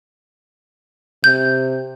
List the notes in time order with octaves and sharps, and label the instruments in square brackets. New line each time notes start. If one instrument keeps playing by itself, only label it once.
[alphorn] C3 [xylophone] G6